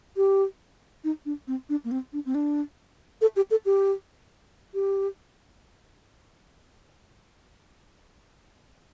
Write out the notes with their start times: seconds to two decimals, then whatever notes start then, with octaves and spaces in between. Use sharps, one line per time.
0.17 G4
1.04 D#4
1.26 D4
1.47 C4
1.69 D4
1.84 A#3
1.91 C4
2.13 D4
2.26 C4
2.35 D4
3.21 A4
3.36 G4
3.51 A4
3.65 G4
4.74 G4